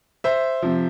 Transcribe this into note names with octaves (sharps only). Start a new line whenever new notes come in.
C5 E5
C3 F3